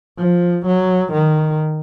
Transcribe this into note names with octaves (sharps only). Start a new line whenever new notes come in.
F3
F#3
D#3